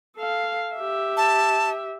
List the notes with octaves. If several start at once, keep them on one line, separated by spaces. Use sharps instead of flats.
A4 F5
G4 E5
A5